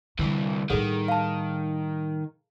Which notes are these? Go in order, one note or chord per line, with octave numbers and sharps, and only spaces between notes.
C2 D3 E3 G3
A2 D#3 G3 G#4 A4 F#5
F5 A5